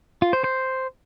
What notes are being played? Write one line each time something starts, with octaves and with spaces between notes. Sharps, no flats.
F4
C5
C5